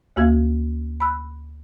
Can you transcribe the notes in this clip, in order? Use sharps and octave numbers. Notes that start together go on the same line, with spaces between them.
D2 A#3 F#4 F5 G#6
B5 E6 F#6